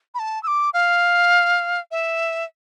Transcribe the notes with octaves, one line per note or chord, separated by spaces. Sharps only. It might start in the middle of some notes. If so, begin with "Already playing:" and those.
B5
A5
E6
D6
F5
E5